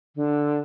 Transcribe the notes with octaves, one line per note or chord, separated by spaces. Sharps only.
D3